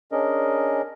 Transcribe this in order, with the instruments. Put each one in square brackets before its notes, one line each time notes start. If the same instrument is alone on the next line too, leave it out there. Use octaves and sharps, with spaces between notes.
[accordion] C#4 D4 G#4 A#4 D#5